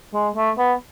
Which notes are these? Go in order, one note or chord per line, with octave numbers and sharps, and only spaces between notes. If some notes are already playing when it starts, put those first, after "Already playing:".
G#3
A3
B3